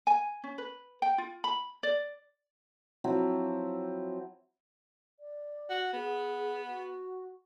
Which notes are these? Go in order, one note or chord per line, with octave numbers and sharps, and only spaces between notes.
G#5
C#4
B4
G5
F4
B5
D5
F3 F#3 C4 E4
D5
F#4
B3 G#4
F#4